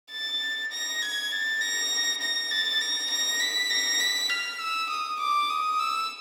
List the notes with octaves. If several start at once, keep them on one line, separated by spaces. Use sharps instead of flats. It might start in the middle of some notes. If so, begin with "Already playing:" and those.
A6
A#6
G#6
A6
A#6
A#6
A6
A#6
A#6
B6
A#6
B6
F6
E6
D#6
D6
D#6
E6